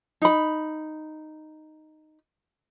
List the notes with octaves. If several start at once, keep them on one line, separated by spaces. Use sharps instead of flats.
D#4 B5